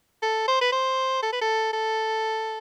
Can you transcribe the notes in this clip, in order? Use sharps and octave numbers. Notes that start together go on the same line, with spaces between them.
A4
C5
B4
C5
A4
B4
A4
A4